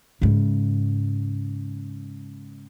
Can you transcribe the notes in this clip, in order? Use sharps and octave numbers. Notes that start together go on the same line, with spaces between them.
G#2 C#3